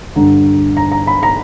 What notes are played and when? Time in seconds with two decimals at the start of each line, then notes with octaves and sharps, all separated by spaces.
0.16 G2 D3 A#5
0.77 A#5
0.92 A#5
1.07 B5
1.23 A#5